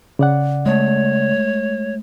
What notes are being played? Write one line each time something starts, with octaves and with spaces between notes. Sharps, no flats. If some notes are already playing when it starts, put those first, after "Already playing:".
C#3 D5 F#5
G#3 A3 C#5